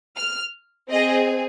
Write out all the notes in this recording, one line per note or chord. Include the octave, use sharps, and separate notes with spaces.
F6
C4 G#4 D#5